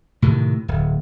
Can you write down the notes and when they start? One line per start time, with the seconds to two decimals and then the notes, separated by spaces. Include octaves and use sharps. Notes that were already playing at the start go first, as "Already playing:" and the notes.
0.22 A2 C3 D#3
0.68 D1